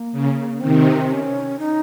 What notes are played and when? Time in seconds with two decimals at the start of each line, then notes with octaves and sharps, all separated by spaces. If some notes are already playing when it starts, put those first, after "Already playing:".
Already playing: A#3
0.12 C#3
0.61 C3 D#3 C4
1.11 C#4
1.59 D#4